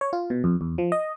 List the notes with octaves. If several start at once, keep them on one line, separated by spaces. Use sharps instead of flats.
C#5
F4
B2
F2
E2
F3
D#5